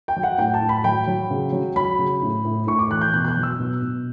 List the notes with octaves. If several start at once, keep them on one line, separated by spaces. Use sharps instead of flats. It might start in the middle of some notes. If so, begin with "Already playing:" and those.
G5
F#3
F#5
A2 G5
A5
A2
B5
F#3 G5
F#3
C#3
F#3
F#3 B5
C#3
A2
A2
A2 C#6
D6
E3 F#6
G6
B2 F#6
G6
F#6
F#3
E6
B2
B2